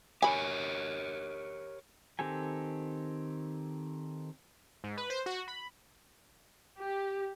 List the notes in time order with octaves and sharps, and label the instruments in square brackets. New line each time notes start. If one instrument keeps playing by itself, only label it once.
[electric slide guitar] G4 A#4 C#5 [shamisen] G#5 B5
[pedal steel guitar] D#3 C4 G4 A4 G#5
[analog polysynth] G#2
B4
C5
F#4
B5
[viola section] G4